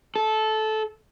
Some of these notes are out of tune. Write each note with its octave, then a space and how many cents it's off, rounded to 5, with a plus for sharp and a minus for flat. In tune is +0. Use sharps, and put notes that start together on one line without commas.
A4 -15